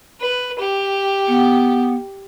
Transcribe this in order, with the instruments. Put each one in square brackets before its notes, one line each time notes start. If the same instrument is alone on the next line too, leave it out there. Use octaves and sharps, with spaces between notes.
[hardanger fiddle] B4
G4
[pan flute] B3